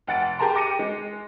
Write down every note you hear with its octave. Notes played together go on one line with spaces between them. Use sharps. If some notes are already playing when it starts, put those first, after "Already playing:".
F1 F#5 A6 D7
G4 G#4 A#4 A5 A#5 C6
G5 D6 A#6 C#7 D#7
G#3